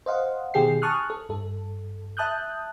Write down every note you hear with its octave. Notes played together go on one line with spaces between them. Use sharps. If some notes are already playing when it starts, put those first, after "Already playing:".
C5 D#5 F5 F#5
B2 D#3 G4 G#4 G5 C7
G#5 A5 C#6 D#6 F6 F#6
A4
G2 A4
E5 A5 D#6 F#6 G6